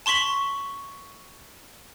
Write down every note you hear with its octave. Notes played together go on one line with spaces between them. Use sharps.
A5 C6 C#6 B6 F#7